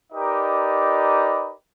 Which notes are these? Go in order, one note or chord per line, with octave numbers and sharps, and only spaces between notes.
D#4 G4 A#4 B4 D5 D#5